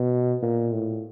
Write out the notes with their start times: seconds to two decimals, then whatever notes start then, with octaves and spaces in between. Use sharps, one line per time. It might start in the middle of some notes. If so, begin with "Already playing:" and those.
Already playing: B2
0.42 A#2
0.73 A2